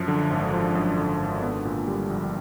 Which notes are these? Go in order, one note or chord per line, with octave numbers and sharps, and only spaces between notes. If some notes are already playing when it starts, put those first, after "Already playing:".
Already playing: F#2 F3
D3
G#1
F3
F#2
D3
G#1
B3
A#2
G3
A#1